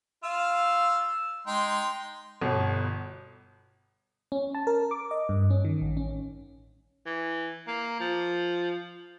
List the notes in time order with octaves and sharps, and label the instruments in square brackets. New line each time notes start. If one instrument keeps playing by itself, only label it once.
[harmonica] F4 F5 [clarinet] E6
[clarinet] G#3 [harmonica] D#4 G5 C6
[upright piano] G1 B2
[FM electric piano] C#4
A5
A#4
D6
D#5
G2
C#4
D#3
A1
C#4
[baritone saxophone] E3
A#3
F3